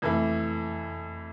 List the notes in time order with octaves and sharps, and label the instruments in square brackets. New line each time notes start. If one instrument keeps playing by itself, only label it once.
[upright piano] F2 E3 A3 E4